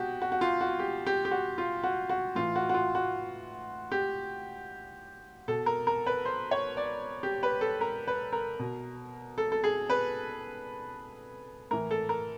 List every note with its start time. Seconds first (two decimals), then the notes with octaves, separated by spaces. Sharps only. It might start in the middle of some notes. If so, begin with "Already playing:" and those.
Already playing: B2 F#4 G4
0.22 F#4
0.32 F#4
0.41 F4
0.61 F#4
0.79 G4
1.07 G4
1.25 G4
1.31 F#4
1.58 F4
1.83 F#4
2.09 F#4
2.35 A2 E3 F4
2.56 F#4
2.69 F#4
2.74 F4
2.95 F#4
3.92 G4
5.48 B2 A4
5.66 A#4
5.87 A#4
6.06 B4
6.25 C5
6.51 C#5
6.77 D5
7.23 G4
7.43 B4
7.61 A4
7.81 A#4
8.08 B4
8.33 A#4
8.59 B2
9.38 A4
9.52 A4
9.64 G#4
9.90 B4
11.71 A2 E3 A#4
11.91 A4
12.09 A#4